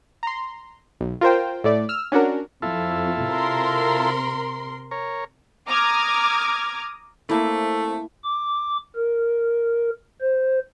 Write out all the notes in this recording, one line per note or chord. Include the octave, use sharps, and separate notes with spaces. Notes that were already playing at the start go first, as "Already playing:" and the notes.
A#5 C6
B1
F4 A#4 C5 G5
A2 A3 D5
E6 F6
C#4 D4 F#4 A#4
F2 E4 F4 A4
C3 A#4 C6
A#4 C#5
A#5 D6 D#6 F6 G#6
A3 A#3 C4 E4
D6
A#4
C5